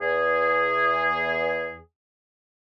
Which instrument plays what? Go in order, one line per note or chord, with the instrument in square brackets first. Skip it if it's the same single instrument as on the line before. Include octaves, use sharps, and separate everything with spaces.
[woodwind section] E2 G#4